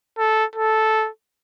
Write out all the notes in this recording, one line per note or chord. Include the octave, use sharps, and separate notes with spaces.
A4
A4